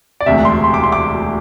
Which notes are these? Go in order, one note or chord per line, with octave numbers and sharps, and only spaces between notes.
D5
E1 D2 C3 E5
C6
C6
D6
C6
D6